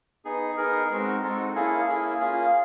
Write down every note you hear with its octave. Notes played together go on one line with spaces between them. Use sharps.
B3 D#4 G#4
B3 D#4 G#4 A#4
G#3 C4 D#4 F#4
G#3 C4 D#4 F#4 A4
A#3 C#4 E4 G#4 A4
A#3 C#4 E4 G#4
A#3 C#4 F4 G#4